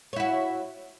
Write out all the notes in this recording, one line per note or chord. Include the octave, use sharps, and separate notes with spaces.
E4 F#4 C#5